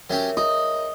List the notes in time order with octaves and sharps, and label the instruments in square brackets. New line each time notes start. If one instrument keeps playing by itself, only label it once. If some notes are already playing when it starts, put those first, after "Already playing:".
[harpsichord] F#3 C#4 G4 [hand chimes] A#4 C#5 E5
[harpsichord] D#4 [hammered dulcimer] D#5